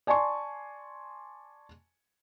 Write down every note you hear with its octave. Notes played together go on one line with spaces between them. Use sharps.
D5 G#5 A5 C6 C#6